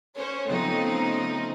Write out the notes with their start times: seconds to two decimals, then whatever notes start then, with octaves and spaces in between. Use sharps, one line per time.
0.15 C#4 C5 C#5
0.46 C#3 F3 A3 B3 C4 D#4